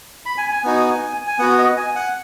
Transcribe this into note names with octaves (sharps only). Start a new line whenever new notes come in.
B5
G#5
G#5
B3 D#4 F#4
G#5
B3 F#4 F#5
D#5
G#5
F#5